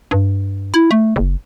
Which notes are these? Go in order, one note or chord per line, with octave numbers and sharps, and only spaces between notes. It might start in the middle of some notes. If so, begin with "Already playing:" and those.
G2
E4
A3
F#1